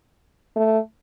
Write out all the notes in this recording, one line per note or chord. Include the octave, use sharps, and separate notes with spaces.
A3